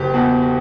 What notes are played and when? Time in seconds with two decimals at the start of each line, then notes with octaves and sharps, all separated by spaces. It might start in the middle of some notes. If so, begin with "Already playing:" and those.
Already playing: F#1 G4
0.14 E2 B2